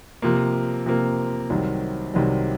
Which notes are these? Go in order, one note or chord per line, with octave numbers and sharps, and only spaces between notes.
C3 F3 A#3
C3 F3 A#3
C2 C3 D#3 F#3
C2 C3 D#3 F#3